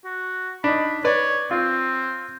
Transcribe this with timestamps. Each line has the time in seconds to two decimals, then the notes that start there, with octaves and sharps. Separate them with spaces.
0.05 F#4
0.64 D4 D#4 B5
1.04 B4 C#5 D5
1.51 C4 F4